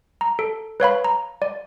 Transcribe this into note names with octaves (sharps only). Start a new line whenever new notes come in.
A#5
A4
B4 C#5 F5 B5
A#5
D5